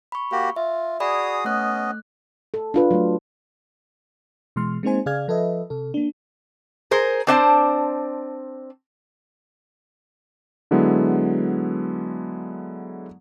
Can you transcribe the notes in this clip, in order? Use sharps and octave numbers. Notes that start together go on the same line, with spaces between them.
B5 C#6
A#3 F#4 G4
F4 E5
F#4 G#4 D5 G#5 B5 D#6
A3 B3 C#4 D#5 F#6
A4
D4 F4 B4
F#3 A3
B2 E3 G#3 C6 F6
G#3 A#3 C4 D#4 C5 G#5
C#3 G#4 D5 F5 F6 G#6
F3 A4 B4 D#5 E5
C3 A4
A#3 D4
G#4 A#4 C5
C4 D4 C5 D5 F5 A5
D3 F#3 G#3 B3 E4